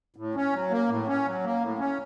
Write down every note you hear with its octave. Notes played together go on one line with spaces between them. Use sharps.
A2
C#4
F#3
A#3
A2
C#4
F#3
A#3
A2
C#4